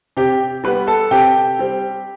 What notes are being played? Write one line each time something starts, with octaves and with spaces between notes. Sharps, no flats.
C3 G4 G5
G3 B3 B4 B5
A4 A5
C3 G4 G5
G3 C4